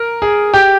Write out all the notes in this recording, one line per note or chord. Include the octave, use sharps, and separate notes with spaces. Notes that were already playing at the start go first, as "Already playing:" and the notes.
Already playing: A#4
G#4
G4